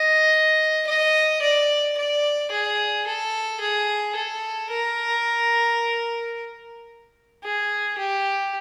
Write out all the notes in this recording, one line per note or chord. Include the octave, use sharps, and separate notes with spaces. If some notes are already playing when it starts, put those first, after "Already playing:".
Already playing: D#5
D#5
D5
D5
G#4
A4
G#4
A4
A#4
G#4
G4